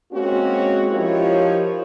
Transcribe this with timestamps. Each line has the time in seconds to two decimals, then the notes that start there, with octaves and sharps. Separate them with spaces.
0.12 G#3 A#3 C4 C#4 F#4
0.90 F3 D#4 E4 G4 A#4 C#5